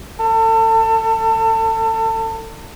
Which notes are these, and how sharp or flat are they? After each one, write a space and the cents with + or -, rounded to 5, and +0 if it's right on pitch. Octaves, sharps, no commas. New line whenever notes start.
A4 +30